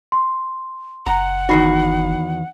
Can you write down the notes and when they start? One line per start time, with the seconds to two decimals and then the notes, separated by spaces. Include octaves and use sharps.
0.12 C6
1.06 F#1 F#5 A#5
1.49 E2 D#3 D#4 F#4 B5 C7